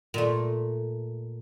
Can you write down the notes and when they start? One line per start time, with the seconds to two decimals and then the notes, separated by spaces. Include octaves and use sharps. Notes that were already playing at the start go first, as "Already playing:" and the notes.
0.14 A#2 A3